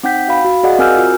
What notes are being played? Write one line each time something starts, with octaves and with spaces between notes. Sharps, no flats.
C4 D#4 F#5 G5 G6 B6
F#4 F5 B5
F#4
F#4 G#4 D5 D#5 F5 F#5
C4 A#4 G#5 E6 F6 G6
F4 F#4